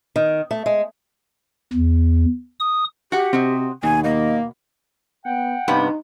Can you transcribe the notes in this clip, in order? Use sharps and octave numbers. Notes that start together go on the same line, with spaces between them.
D#3
A3
G#3
E2
D#6
F#4 G4 F#5
C3 C4 F#4 D#5
D#2 B2 G#5
A#3 D#5
B3 F#5 G5
G2 C3 B3 D#4